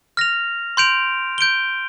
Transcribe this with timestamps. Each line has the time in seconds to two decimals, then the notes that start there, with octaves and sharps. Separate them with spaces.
0.17 F6 A#6 F7
0.77 C6 G6 D7 F7
1.38 G6 D7 G7